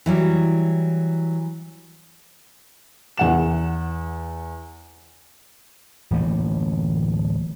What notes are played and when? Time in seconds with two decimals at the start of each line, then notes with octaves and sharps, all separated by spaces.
0.06 E3 F#3 G3
3.18 E2 F#5 E7
6.11 D1 E3 A3 A#3